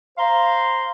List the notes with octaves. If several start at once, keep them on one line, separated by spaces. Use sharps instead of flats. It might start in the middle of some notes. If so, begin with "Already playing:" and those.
C5 F5 A#5 C6